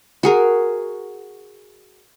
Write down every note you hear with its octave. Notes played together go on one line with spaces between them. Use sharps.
F#4 G#4 A#4